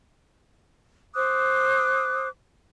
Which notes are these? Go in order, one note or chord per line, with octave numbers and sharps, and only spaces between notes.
C5 D6 D#6 F#6